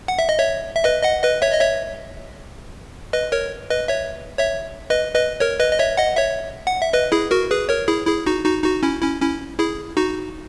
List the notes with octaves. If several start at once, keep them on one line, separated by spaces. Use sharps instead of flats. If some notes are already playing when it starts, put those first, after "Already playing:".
F#5
E5
D#5
C#5 E5
E5
B4 D#5
D#5 F#5
B4 D#5
C#5 E5
D#5
C#5 E5
B4 D#5
A#4 C#5
B4 D#5
C#5 E5
C#5 E5
B4 D#5
B4 D#5
A#4 C#5
B4 D#5
D#5
C#5 E5
D#5 F#5
C#5 E5
F#5
E5
B4 D#5
E4 G#4
F#4 A#4
G#4 B4
A#4 C#5
E4 G#4
E4 G#4
D#4 F#4
D#4 F#4
D#4 F#4
C#4 E4
C#4 E4
C#4 E4
E4 G#4
D#4 F#4